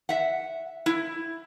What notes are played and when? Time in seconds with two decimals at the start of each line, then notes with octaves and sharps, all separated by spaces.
0.09 E5 F#5
0.86 E4